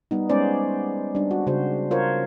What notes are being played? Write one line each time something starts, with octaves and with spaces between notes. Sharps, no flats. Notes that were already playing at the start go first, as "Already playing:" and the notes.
G3 B3 D#4
G#3 B3 C#4 C5 D5
G3 D4
F#4
C#3 F#4 C5
F4 A#4 C5 C#5